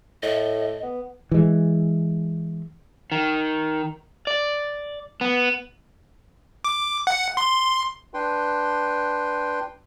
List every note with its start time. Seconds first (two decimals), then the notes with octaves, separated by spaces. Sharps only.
0.23 A2 D#5
0.83 B3
1.31 E3 G#3
3.12 D#3
4.27 D5
5.21 B3
6.64 D6
7.07 F#5
7.37 C6
8.14 D4 B4 G5 C6